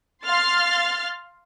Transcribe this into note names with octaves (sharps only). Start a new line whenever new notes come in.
F5 C6 F6 A6